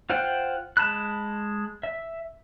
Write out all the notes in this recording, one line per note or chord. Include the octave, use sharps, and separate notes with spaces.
F4 C5 F#5 G5
G#3 A5 B5 F#6
E5